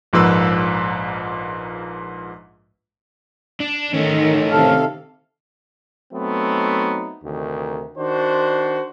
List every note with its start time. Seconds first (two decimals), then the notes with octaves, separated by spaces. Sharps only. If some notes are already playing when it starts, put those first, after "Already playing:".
0.13 A#1 G#2 F3 A#3 B4 E6
3.60 D4
3.94 D#3 A3 C#4
4.51 C3 A4 F5
6.14 F#3 A3 B3 C4 D#4
7.24 D2 C3 D#3
7.98 D#3 D4 F#4 C5